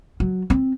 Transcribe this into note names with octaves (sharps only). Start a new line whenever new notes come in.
F#3
C4